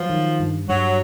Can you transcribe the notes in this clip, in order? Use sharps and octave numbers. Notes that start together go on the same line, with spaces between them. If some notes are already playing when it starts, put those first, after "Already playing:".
Already playing: F3 F#3
D#3
G2
G2 F#3